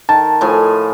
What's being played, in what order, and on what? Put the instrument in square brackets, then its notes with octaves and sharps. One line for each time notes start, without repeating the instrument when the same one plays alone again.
[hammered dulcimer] D#3 [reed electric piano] A5
[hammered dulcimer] A2 F3 G#5